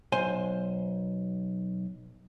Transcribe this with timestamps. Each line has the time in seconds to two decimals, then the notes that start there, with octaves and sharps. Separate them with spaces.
0.12 B1 C5 G#5 C6